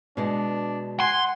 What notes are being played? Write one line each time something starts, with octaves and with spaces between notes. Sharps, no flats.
B2 G#3 D4
F#5 G#5 C6